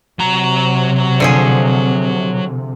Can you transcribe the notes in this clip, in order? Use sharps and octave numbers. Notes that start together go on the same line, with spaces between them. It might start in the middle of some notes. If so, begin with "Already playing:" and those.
C3 F#3 A#5
D3 F3 G#4